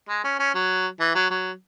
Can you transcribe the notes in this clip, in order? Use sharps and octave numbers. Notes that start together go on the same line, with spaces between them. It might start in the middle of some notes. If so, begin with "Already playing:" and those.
G#3
C#4
C#4
F#3
E3
F#3
F#3